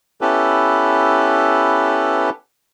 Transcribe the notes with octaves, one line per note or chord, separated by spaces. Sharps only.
B3 C#4 E4 G4 A4 B4